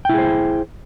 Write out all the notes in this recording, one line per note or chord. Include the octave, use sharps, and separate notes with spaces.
E4 G#4 C5 G5